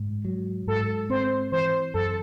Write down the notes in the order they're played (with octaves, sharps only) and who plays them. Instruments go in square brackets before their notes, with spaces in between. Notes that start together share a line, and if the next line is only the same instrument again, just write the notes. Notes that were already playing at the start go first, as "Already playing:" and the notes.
Already playing: [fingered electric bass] G#2
F#3
[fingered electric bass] G#2 [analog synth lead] A4
[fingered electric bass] C4 [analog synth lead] C5
[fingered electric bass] E3 [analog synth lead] C5
[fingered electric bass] F#2 [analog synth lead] A4